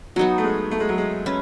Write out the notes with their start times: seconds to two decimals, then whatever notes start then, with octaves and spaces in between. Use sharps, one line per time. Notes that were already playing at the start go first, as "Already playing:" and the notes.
0.16 F#3 B3 D#4 F#4
0.38 A3
0.43 G#3
0.71 A3
0.80 G#3
0.89 F#3
0.98 G#3
1.26 C#4 B4